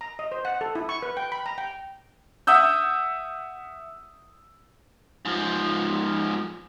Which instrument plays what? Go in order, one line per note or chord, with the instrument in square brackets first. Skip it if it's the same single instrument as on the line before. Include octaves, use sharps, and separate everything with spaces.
[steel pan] A#5
D#5
C5
F#5
A4
E4
C#6
B4
G5
B5
A#5
G5
[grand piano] E5 F#5 D#6 E6 G6
[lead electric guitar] G#2 F3